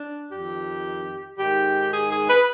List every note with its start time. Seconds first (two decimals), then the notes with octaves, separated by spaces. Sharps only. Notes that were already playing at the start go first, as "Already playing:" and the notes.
Already playing: D4
0.31 F2 D#3 G4
1.38 G#2 D#3 G4
1.92 G#4
2.11 G#4
2.29 B4